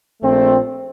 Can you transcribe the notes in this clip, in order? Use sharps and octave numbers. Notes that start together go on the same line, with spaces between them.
A#1 A#2 A3 C4